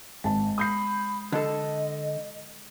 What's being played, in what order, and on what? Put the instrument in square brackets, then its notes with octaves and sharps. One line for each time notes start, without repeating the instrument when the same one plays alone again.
[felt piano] G#1 A5 [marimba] G#3
[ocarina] B5 [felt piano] D#6 G6 C7
[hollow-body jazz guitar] D3 A4 [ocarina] D#5